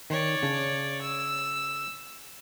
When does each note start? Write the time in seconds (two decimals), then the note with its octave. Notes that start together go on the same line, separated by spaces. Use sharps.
0.10 D#3 C#5 D5
0.43 C#3 D4
1.01 E6